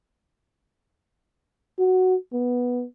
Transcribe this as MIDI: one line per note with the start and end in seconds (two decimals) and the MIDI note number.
1.79 2.16 66
2.33 2.84 59